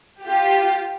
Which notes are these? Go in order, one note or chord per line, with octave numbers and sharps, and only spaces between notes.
F4 G4